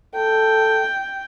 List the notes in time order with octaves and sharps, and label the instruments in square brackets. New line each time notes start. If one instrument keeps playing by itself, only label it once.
[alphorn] A4 [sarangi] G5